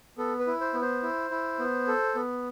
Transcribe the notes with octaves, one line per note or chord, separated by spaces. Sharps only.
B3 A4
B4
E4
C5
B3
C5
E4
E4
B3
A4
B3